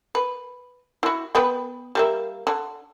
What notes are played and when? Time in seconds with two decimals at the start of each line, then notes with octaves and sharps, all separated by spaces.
0.15 B4
1.03 E4 F#4
1.35 B3 B4 G5
1.95 G3 A#3 E5
2.47 D3